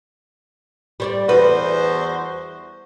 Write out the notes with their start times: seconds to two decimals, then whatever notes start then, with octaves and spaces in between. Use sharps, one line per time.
1.00 G3 C5 D5
1.29 E2 F#4 B4 C5